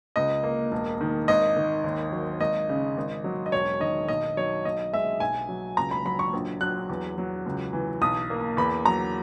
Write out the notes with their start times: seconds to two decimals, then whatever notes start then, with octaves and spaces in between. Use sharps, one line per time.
0.16 C#2 D#5
0.43 A#3
0.72 E1
1.01 D#3
1.28 G#1 D#5
1.56 D#3
1.84 D#2
2.12 F#3
2.40 G#1 D#5
2.69 C#3
2.97 G#1
3.24 F#3
3.46 D#5
3.52 E1 C#5
3.80 D#3 D#5
4.08 B1 D#5
4.37 F#3 C#5
4.65 B1 D#5
4.93 G#3 E5
5.20 B1 G#5
5.49 F#3
5.77 C#2 A#5
5.91 B5
6.05 F#3 B5
6.19 C#6
6.33 A#1
6.61 F#3 F#6
6.89 E2
7.18 F#3
7.46 C#2
7.73 E3
8.01 B1 D#6
8.30 A#3
8.57 E2 B5
8.85 F#3 A#5